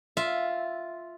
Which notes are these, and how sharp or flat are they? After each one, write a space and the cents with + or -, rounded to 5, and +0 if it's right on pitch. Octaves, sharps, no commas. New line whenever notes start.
F4 +0 E5 +0